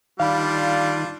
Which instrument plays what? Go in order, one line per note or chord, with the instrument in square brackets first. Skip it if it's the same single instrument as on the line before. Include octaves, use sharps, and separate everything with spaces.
[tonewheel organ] D#3 [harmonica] G3 D4 [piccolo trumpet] F4 [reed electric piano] F5 B5